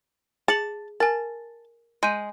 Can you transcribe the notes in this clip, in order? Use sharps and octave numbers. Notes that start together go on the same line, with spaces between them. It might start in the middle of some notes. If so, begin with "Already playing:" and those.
G#4 A5 C#7 F#7
A#4 G#5 A5
G#3 G#5 G6 D#7